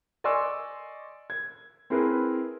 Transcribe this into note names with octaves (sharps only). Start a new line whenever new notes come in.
D5 D#5 G#5 C6 C#6 E6
G#6
C4 E4 G#4 A#4 B4